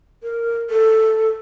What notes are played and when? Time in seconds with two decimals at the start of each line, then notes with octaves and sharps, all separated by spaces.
0.23 A#4
0.70 A4